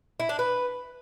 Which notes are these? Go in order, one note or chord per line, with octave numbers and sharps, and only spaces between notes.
E4
D4
B4